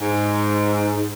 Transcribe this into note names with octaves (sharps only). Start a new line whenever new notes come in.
G#2